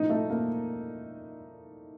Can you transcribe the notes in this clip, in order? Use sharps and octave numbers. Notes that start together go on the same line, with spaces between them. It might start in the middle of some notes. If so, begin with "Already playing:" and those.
Already playing: A2 F3 D#4 D#5
A3 A4
A#3 A#4